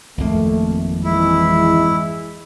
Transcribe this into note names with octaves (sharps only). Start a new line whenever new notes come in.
G#1 F2 A3 A#3
E3 G#3 E4